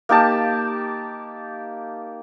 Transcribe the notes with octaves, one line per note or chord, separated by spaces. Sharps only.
A#3 D#4 G4 A5